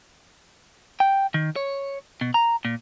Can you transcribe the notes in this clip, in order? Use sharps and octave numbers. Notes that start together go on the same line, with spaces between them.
G5
D#3
C#5
B2
A#5
A#2